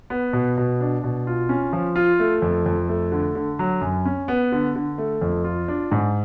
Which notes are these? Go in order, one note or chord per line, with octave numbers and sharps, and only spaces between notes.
B3
B2
B2
D4
B2
F4
C#4
F3
F4
A3
F2
F2
A3
D3
D3
F#3
F#2
C#4
B3
D3
D3
A3
F2
F4
D4
G#2